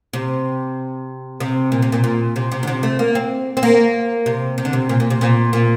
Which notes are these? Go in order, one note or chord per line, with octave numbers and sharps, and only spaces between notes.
C3
C3
A#2
C3
A#2
A#2
C3
C3
D3
C3
A3
A#3
C4
C4
A#3
C3
C3
D3
C3
A#2
A#2
C3
A#2
A#2